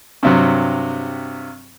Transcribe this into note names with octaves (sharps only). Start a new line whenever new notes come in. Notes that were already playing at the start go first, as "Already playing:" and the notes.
G2 C3 F#3